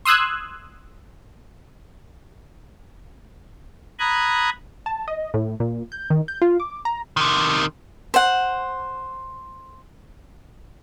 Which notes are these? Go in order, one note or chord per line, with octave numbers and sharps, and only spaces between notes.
C6 D#6 E6 F#6 G#6
A#5 B5 D#6 F#6 G#6
A5
D#5
A2
A#2
G6
D#3
G6
F4
D6
A#5
C3 D#3
C5 F#5